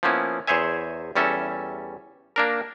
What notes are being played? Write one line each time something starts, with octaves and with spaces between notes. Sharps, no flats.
F3 A#3 B3 C#4 E4
E2 G#4 C5 C#5 E5 G#5
E2 G3 C#4 A4 E5
A#3 D4 A#4